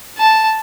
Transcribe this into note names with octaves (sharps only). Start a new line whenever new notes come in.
A5